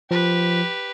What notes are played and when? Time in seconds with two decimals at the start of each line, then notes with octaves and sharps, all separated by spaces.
0.11 F3 G4 B4